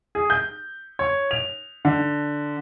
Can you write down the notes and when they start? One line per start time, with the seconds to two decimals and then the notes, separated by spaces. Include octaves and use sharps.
0.15 G#4
0.30 G6
0.99 C#5
1.31 F7
1.85 D3